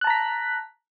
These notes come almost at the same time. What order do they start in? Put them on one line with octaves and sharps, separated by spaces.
F#6 A5 A#5 B6